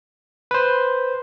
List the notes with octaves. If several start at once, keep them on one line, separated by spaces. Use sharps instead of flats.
B4 C5